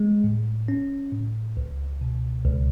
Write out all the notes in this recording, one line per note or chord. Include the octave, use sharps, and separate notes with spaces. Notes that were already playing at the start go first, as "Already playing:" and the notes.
Already playing: G#3
A2
C#4
A2
C#2
B2
C#2